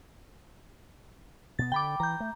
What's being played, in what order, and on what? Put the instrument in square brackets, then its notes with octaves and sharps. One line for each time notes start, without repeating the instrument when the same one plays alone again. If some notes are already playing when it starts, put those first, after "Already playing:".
[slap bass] B2 B3 [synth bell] A6
[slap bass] D3 [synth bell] G5 B5 D6
[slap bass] E3 [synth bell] A#5 G6
[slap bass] A3